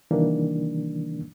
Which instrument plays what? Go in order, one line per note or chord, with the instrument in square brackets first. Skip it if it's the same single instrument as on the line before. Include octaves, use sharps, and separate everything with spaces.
[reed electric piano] C3 D#3 E3 G3 A#3 D4